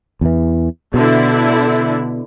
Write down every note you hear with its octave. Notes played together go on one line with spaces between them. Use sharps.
E2 E3
B2 D3 E4